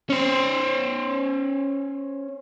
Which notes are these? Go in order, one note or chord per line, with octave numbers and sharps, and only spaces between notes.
C#4 C5